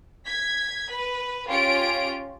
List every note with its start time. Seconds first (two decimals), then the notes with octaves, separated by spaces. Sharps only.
0.24 G#6 B6
0.90 B4
1.48 C#4 F4 G4 D7